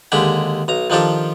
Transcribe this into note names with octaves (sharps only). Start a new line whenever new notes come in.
D#2 D3 G#3 G4 B5
B1 A#5
D#3 F3 D4 G4 A4